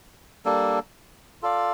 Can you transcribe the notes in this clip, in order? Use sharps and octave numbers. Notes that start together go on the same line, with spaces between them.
G3 A#3 D4 A4
F4 A4 D5 F5